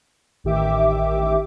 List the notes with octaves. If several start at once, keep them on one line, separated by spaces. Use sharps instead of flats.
A1 D#3 G4 E5 D6